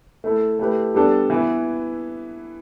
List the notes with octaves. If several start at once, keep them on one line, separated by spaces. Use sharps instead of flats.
A3 E4 A4
A3 E4 G4 B4
G3 B3 D4 A4
E3 B3 E4